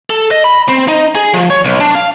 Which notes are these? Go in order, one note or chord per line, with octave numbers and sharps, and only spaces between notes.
A4
D#5
B5
C4
D#4
G#4
F3
C#5
B1
D4
F5